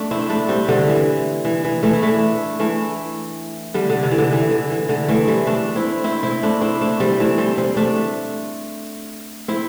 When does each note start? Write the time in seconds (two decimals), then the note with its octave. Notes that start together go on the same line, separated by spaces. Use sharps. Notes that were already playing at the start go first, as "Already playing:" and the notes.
Already playing: A3 D4
0.11 C4 E4
0.30 A3 D4
0.49 G3 C4
0.68 D3 G3
0.88 E3
1.45 E3
1.65 E3
1.83 E3 A3
1.93 E4
2.02 A3 D4
2.60 E3 A3
3.74 D3 G3
3.90 D3
4.03 C3
4.11 E3
4.18 D3
4.32 E3
4.51 D3
4.70 E3
4.89 D3
5.08 E3 A3
5.27 G3 C4
5.46 A3 D4
5.76 C4 E4
6.04 C4 E4
6.23 C4 E4
6.43 A3 D4
6.61 C4 E4
6.81 A3 D4
7.00 G3 C4
7.20 E3 A3
7.38 G3 C4
7.58 G3 C4
7.77 A3 D4
9.48 C4 E4